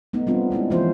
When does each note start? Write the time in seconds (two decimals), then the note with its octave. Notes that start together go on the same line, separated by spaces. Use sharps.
0.13 A3 B3 D#4
0.27 G3 B3 C4 D4 F4
0.51 G#3 C#4 D#4 E4
0.70 E3 F3 A#3 C#4 F4 C5